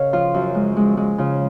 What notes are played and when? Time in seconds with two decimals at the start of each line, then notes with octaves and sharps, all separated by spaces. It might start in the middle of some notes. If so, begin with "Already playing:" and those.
Already playing: C#3 A#4 C#5 D#5 F5
0.13 F3 F4
0.34 F#2
0.55 G#3
0.77 G#3
0.97 G#3
1.18 C#3 F4